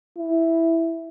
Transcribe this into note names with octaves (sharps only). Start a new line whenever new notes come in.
E4